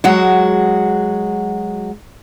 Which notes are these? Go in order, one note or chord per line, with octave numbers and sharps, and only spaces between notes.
F#3 G#3 F#4